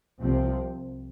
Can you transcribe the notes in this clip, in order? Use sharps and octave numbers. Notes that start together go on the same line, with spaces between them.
C2 C3 F3 C4